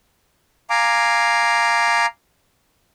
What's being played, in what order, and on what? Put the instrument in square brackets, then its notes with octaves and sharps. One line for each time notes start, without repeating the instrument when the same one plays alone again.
[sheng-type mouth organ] F5 G#5 A#5 D6